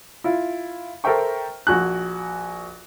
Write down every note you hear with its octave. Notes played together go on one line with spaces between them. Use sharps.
E4 F4
A4 A#4 C5 E5 G5 C#6
A#1 F#4 G#5 F#6